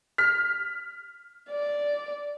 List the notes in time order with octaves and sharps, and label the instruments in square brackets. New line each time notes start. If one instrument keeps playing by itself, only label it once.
[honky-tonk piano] F6 B6
[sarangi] D5